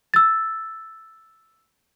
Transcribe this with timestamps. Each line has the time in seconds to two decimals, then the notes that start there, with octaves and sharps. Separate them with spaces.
0.14 E6 A6